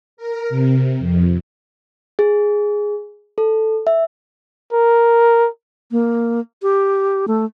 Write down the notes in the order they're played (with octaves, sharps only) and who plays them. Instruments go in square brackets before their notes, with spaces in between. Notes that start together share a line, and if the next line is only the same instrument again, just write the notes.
[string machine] A#4
C3
F2
[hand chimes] G#4
A4
E5
[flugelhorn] A#4
[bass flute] A#3
G4
A3